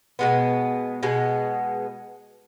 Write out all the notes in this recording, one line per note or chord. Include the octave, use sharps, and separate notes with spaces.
B2 G#3 B3
B2 G#3 B3